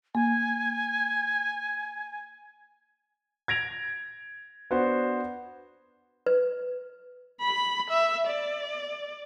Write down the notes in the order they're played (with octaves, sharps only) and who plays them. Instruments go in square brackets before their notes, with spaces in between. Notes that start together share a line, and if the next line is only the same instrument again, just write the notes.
[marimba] A#3 [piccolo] G#5
[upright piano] G#6 A#6 D7 F7
B3 D4 F#4 C5
[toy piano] B4
[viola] B5
E5
D5